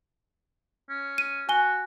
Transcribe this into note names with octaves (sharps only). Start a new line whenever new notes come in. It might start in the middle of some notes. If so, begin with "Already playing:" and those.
C#4
D#7
F#4 G#5 G7